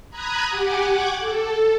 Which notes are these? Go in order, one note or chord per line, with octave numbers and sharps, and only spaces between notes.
A#5 B5 D#6 F#6 G#6
G4 F#5 G#5 D6
F#5 G5 C#6 D6 F#6 G#6
A4